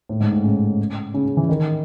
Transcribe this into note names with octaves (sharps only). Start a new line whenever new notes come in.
A2
G#2
A2
C#3
C#3
C#3
E3
D#3